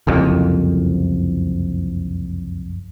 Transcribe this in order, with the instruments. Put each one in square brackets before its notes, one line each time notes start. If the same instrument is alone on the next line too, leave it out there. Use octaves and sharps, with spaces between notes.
[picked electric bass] F#1 C2 F2